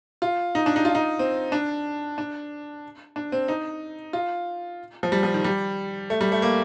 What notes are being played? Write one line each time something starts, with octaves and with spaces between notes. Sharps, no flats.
F4
D#4
D4
D#4
F4
D#4
C4
D4
D4
D4
C4
D#4
F4
F3
G3
F3
D#3
G3
A3
G3
A3
A#3